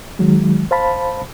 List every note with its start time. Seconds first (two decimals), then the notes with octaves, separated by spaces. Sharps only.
0.19 D#3 F#3 G#3
0.71 C5 F5 A5 B5